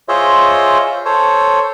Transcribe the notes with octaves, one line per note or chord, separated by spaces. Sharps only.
F4 G#4 C5 C#5 D#5 E5
A4 C5 C#5